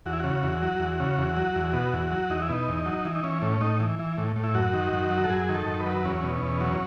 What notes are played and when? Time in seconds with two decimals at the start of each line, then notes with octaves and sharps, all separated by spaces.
0.06 E2 F#4
0.13 E4
0.20 C#3 F#4
0.43 E2
0.62 F#3
0.80 E2
1.00 C#3
1.18 E2
1.36 F#3
1.56 E2
1.73 B2
1.93 E2
2.11 F#3
2.30 E2 D#4
2.42 E4
2.49 B2 D#4
2.68 E2
2.86 F#3
3.05 E3
3.15 D#4
3.23 E3 C#4
3.42 A2 C#4
3.61 A2 D#4
3.80 E3
3.99 E3
4.17 A2
4.36 A2
4.44 E4
4.55 F#2 F#4
4.74 D#3
4.93 F#2
5.11 F#3
5.24 A4
5.30 F#2 G#4
5.49 D#3
5.54 A4
5.66 F#2
5.80 B4
5.86 F#3
6.04 E2 C#4
6.23 B2
6.42 E2
6.61 F#3